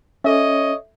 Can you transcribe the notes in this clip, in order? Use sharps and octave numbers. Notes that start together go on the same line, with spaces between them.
C#4 A4 C#5 D#5 E5